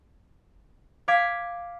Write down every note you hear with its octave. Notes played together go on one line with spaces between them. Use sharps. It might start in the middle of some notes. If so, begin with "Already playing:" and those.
F5 D6 G#6 B6